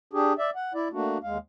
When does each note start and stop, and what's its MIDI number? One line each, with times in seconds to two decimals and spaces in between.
0.13 0.33 62
0.13 0.33 67
0.13 0.33 68
0.38 0.50 74
0.38 0.50 76
0.55 0.73 78
0.74 0.88 64
0.74 0.88 74
0.93 1.18 57
0.93 1.18 58
0.93 1.18 62
0.93 1.18 66
1.23 1.38 39
1.23 1.38 56
1.23 1.38 77